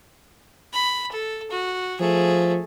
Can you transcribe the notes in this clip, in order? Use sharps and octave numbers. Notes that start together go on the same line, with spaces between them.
B5
A4
F#4
F3 A3 G#4